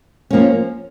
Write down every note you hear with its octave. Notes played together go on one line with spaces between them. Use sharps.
F3 A#3 C#4